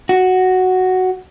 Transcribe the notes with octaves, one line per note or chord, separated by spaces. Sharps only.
F#4